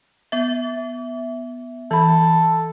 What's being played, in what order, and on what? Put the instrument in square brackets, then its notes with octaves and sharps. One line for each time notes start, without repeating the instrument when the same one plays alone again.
[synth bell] B3 E5
[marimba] E3 B5 [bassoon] A4